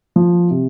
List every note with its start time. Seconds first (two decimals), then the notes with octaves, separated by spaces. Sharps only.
0.16 F3
0.51 C3